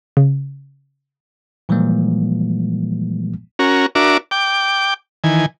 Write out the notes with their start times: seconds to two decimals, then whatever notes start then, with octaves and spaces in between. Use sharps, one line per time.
0.17 C#3
1.69 A#2 E3 F3 G3 G#3 A#3
3.59 C#4 F#4 A#4
3.95 D4 F#4 A#4 E5 D6
4.31 G5 D6
5.24 D#3 E3 G#5